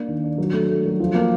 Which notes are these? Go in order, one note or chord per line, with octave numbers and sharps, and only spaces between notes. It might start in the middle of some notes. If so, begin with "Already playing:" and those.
Already playing: A#3 D4
D#3
D4
F#3
A3
A3
F#3
F3
A#3